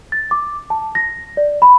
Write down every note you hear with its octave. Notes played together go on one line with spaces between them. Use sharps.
A6
D6
A5
A#6
D5
B5